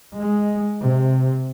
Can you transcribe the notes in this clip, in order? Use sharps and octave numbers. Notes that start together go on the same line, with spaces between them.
G#3
C3